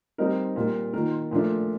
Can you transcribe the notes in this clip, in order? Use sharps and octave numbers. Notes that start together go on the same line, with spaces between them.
G3 C4 D#4 A#4
A#2 G3 A#3
D#3 A#3 F4 A#4
A#2 F3 A3 D4